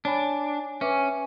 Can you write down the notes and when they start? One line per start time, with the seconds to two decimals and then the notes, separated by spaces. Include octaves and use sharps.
0.05 D4 C#5 G#5 B5
0.81 C#4 B4 E5 G#5 D6